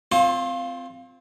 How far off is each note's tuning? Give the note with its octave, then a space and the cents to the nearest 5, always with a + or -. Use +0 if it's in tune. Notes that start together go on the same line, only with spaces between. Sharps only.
C4 -15 F4 +0 C5 +40